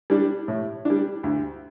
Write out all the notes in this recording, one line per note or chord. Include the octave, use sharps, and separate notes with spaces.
G3 D4
A2
G3 D4
D2